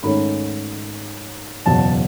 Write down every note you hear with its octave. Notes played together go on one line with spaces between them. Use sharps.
G#2 D#3 A3 C#4 B5
F#1 E2 B2 F#3 A5